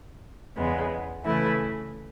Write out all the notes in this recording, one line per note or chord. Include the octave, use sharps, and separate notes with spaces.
E2 C#3 G#3 B3
C#3 E3 A3 E4 B4